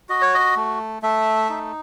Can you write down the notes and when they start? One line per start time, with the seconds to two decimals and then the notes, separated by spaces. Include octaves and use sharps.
0.09 F#4 D#5
0.22 C#5
0.34 D#5
0.56 A3
1.03 A3 E5
1.49 D#4